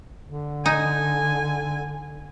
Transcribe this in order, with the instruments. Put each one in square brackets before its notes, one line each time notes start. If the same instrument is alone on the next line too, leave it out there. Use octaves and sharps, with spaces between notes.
[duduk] D3
[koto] D#4 [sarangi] G#5